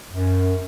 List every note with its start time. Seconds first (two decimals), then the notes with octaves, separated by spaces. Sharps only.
0.12 F#2